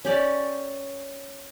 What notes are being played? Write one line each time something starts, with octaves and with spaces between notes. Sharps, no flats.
C#4 G4 D5